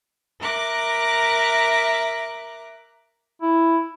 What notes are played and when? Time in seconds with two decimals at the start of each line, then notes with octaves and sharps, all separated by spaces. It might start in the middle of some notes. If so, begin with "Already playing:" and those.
0.40 A#4 E5 A#5 D6 F#6
3.42 E4